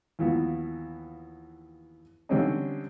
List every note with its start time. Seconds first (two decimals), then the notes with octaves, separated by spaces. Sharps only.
0.19 D#2 E3 F3 B3
2.29 D3 G3 C4 C#4 D#4